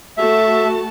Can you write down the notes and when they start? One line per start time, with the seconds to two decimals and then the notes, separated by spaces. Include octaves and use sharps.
0.17 A3 F#4 E5 A5